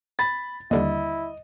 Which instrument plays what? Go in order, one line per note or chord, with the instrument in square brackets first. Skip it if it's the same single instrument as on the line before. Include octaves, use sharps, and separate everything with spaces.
[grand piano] B5 A6
[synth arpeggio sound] D#2 D3 G3 [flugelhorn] E4 [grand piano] D#5